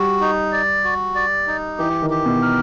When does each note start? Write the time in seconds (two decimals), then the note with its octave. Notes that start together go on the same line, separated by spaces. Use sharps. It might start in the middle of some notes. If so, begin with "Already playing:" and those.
Already playing: G3 F#4
0.20 D#4
0.52 D5
0.84 F#4
1.15 D5
1.47 D#4
1.78 E3 G4
2.02 D#3
2.10 G4
2.26 B2
2.41 A#4